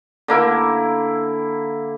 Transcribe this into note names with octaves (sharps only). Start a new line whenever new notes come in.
D3 A#3 E4